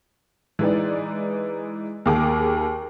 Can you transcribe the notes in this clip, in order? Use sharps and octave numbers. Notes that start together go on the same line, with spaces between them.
E3 G#3 D#4 B4 D5
D#2 G#4 A#4 D6